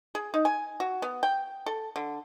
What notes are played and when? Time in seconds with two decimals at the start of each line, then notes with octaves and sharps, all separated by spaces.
0.15 G#4
0.34 D#4
0.45 G#5
0.80 F#4
1.02 B3
1.23 G5
1.66 A4
1.96 D3